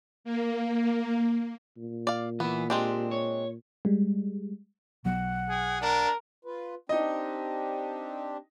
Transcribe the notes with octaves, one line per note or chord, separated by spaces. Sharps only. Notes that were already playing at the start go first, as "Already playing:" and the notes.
A#3
A#2
D5 F5
E3 B3 B4
G#3 C4 D4 G4
C#5
G3 G#3
B1 F#3 B3 F#5
G#4
D4 A#4
F4 B4
C4 D4 D#4 G4 D#5